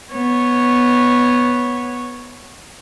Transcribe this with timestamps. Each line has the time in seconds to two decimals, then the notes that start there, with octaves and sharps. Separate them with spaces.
0.13 B3 C#5